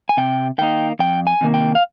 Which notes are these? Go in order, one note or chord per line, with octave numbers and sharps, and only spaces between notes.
G#5
C3 G5
D#3 A#3 D#4 G5
F2 G5
G#5
C3 D#3 A#3
G5
F5